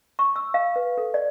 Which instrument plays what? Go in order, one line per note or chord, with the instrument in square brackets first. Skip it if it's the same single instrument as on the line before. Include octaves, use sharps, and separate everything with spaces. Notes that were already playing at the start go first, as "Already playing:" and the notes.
[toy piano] C#6
E6
F5
B4
A4
D5